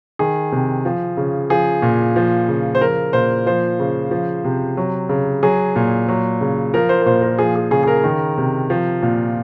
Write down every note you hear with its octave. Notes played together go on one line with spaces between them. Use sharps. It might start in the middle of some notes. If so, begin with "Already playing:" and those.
D#3 G#4
C3
F3
C#3
F3 G#4
A#2
F3
C#3
C5
F3 A#4
A#2 C5
F3 C5
C#3
F3
C3
F#3
C#3
F#3 G#4
A#2
F#3
C#3
F3 A#4
C5
A#4
A#2 C5
A#4
F3 G#4
G#4
C#3 G#4
G#4
A#4
D#3
C3
F3
A#2